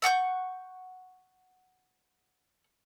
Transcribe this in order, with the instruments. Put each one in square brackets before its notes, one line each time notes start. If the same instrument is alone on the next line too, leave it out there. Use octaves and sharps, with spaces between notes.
[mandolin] E5 F#5 C#6 G6